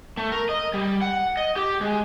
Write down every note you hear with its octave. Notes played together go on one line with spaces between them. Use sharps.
A3
A#4
D#5
G3
F#5
D#5
G4
G#3